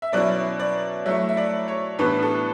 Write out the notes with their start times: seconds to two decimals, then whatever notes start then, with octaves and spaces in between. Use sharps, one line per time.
0.02 E5
0.12 B2 F#3 C#4 E4 D5
0.60 D5
1.06 F#3 A3 E4 E5
1.29 E5
1.37 D5
1.68 C#5
1.99 A2 E3 G3 B3 D4 B4
2.23 A4